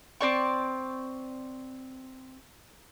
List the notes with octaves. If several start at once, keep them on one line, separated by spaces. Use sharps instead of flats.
C4 D5 C#6